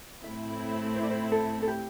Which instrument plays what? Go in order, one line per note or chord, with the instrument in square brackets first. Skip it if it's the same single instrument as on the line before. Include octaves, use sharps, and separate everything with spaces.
[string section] A2 A3 C4 E4 [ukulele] E5
[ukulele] C5
D5
C5
A4
A4
G4